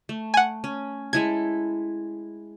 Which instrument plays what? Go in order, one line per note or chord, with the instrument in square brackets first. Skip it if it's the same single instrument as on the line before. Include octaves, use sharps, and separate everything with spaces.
[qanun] A3
[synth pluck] F#5 G#5
[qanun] C#4
[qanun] G#3 E4 A4 [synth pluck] G#6